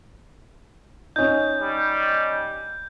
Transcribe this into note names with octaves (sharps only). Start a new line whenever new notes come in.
C#4 D#4 G6
G3